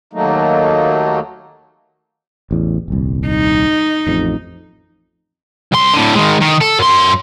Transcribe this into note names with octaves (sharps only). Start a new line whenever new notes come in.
D#2 F#3 A3 A#3 D#4
A1 E2
D#1 C2
D#4
A1 F2
C2 C6
A2 D3
D#3 G#3
D#3
A4
F#2 C6